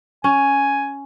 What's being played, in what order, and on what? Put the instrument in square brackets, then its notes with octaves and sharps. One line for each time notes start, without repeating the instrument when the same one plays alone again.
[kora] C#4 [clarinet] G#5